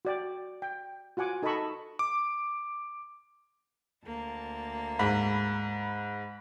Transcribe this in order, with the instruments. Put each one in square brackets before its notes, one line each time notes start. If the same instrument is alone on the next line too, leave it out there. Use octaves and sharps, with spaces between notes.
[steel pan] F#4 D5 G5
G5
F4 F#4 F#5 G#5 D6
D#4 A4 D#5 A5 B5 C#6
[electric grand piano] D6
[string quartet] D2 A#3 A5
[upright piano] G#2 [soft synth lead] B5